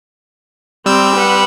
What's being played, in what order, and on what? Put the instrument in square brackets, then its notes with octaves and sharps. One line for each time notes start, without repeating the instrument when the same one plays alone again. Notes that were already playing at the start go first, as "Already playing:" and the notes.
[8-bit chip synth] G3 E6 G6 [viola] C4
[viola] B4 F#5